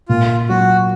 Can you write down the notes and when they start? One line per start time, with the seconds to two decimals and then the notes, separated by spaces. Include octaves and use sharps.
0.09 A#2 F4
0.49 F#3 F#4